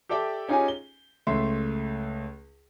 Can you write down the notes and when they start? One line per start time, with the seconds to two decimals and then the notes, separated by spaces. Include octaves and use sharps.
0.09 G4 A4 D5 E5 G5
0.48 C#4 D#4 F4 G4 G#4 G#5
0.68 G7
1.27 C#2 A3 E5 C6